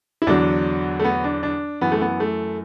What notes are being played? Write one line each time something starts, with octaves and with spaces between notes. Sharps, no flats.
E4
E2 D3 F#3 D4
A3
B3
D4
D4
F#2 E3 B3
A3
B3
A3